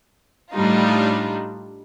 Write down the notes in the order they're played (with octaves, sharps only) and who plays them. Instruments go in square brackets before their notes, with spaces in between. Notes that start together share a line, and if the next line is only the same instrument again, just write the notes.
[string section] A2 G3 D4 D#4 F4